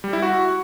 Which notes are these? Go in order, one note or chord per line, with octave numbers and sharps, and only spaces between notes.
G3
E4
F#4